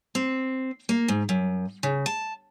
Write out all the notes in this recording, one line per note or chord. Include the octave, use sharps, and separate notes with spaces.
C4
A#3
G#2
F#2
C#3
A5